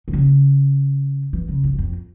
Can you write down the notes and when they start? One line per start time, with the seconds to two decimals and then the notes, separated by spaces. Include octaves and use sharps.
0.08 C3
0.13 C#3
1.33 E3
1.49 C#3
1.64 F2
1.73 E2
1.78 F2